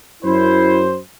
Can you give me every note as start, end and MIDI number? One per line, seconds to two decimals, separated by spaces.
0.23 0.98 42
0.23 0.83 64
0.23 0.98 72